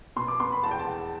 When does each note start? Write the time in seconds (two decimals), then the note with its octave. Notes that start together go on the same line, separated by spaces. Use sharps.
0.16 B2 C6
0.28 D6
0.40 B3 C6
0.52 B5
0.63 E2 A5
0.71 G5
0.79 A5
0.87 E2